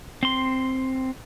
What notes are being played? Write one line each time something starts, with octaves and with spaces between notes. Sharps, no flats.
C4 C6